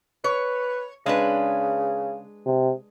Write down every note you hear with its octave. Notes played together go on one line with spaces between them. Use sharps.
B4 C#5
C#3 G#3 D4 B4
C3